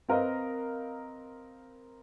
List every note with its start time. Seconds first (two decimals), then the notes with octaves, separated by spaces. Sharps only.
0.09 C4 A#4 B4 D#5 F5